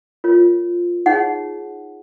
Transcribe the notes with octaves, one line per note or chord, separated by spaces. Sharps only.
F4 A#4 C#5
D#4 G#4 C#5 F#5